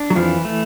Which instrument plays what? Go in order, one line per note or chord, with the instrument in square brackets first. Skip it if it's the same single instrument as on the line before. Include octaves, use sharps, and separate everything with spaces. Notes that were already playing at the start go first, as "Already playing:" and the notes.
Already playing: [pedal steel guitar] D4
[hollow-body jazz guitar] F#3
[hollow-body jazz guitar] F2 F3 [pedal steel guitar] E3
[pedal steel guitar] A3